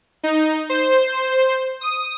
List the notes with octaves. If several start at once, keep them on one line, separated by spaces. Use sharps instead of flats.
D#4
C5
D#6